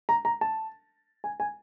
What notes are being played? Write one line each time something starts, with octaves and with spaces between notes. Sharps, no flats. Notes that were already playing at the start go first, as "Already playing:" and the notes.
A#5
A#5
A5
G#5
G#5